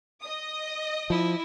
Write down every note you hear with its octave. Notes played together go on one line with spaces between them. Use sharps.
D#5 D#6
F3 E4